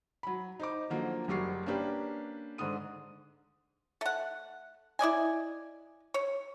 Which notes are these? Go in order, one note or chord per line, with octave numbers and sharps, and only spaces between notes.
F#3 B5
D#4 C5 D6
D3 F3 F#3 A#3
F#1 F#3 G3 C#6 C7
A#3 C#4 D4 G4 B4
G#2 D3 D4 D#6 D#7
A3 F#5
E4 D5 D#5 G#5
C#5